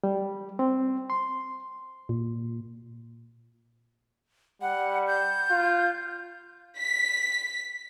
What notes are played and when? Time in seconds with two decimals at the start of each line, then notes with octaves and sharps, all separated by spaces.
0.04 G3
0.59 C4
1.10 C6
2.09 A#2
4.62 G3 F#5
5.07 G6
5.51 F4
6.79 B6